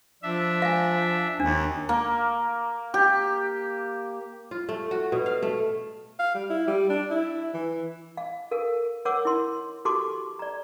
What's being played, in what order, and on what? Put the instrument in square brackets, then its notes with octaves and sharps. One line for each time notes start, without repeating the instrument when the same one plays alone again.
[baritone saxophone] F3 [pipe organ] D4 E5
[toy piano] F5 G#5
[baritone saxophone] D#2 [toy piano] D4
[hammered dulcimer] A#3
G4
[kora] F4
A3
F#4
B2
F5
A3
[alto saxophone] F5
G3
E4
G3
D4
E4
E3
[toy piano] F5
A4 A#4 F5
A#4 C#5 F#5 D6 E6
E4 C6
F#4 G4 A4 A5 C6 D6
D5 A#5